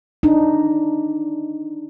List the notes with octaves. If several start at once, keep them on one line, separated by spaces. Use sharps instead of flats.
D4 D#4